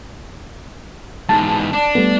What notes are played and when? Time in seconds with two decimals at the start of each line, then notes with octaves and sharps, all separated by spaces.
1.29 E2 G#2 A5
1.73 D4
1.95 G3 A3 B3